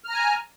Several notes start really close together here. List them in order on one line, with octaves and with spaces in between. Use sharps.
F6 A#5 G#5